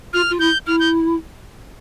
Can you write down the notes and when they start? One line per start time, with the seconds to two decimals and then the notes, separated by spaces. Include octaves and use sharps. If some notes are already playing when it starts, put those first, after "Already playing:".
0.13 F4 F6
0.30 F4
0.39 E4 G6
0.67 E4 F6
0.80 G6